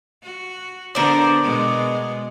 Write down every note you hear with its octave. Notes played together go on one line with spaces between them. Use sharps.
F#4
D3 B3 A#4 C5 D5
B2 G#3 B3